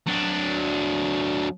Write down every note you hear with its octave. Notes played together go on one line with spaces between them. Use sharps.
F#3 D4